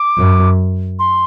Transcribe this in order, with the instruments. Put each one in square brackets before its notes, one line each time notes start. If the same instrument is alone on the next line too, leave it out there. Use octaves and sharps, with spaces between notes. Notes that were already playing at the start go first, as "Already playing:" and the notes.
Already playing: [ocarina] D6
[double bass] F#2
[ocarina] C6